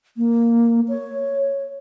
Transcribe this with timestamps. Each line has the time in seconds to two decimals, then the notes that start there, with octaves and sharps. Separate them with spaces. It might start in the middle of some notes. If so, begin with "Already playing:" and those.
0.17 A#3
0.89 C#5